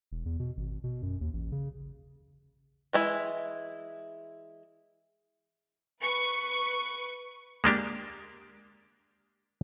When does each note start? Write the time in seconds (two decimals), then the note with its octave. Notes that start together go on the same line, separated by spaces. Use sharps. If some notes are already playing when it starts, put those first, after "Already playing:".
0.12 E1
0.26 E2
0.39 B2
0.57 G#1
0.84 B2
1.02 F#2
1.21 D#2
1.33 A1
1.52 C#3
2.93 E3 G#3 E4
6.03 B4 C#6
7.64 G#3 A#3 D4 G4